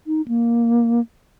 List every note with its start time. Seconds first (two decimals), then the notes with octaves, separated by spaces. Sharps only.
0.07 D#4
0.28 A#3